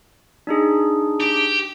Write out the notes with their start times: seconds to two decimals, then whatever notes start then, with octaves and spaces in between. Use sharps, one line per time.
0.47 D4 D#4 G#4
1.21 G4